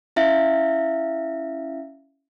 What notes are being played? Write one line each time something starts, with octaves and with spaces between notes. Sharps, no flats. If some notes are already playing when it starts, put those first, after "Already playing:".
C#4 E4 E5 F5